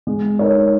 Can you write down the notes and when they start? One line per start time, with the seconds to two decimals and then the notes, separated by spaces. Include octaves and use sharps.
0.07 G#3
0.39 D#4 A#4 C#5